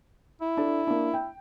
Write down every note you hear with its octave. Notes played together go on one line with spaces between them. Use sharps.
E4
D4 A4
A#3 D4
G5